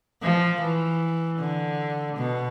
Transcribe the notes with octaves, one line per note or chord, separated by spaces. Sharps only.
F3
E3
D3
B2